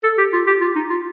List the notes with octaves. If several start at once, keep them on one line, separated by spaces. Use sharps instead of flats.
A4
G4
F4
G4
F4
D#4
F4